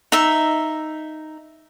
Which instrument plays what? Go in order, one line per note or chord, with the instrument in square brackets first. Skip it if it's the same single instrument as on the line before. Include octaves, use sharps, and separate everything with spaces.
[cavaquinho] D#4 E5